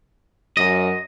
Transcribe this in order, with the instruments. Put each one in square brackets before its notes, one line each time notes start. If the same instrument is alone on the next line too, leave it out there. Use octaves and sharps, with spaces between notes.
[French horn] F#2 [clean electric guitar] D#5